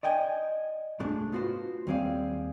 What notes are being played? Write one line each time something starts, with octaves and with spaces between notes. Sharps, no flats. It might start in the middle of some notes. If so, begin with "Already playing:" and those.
D5 D#5 G5 G#5
C2 G#2 A3 D4 G#4 A5
B3 F4 F#4 B4 C5
D#2 G3 C4 G#4 D5 F5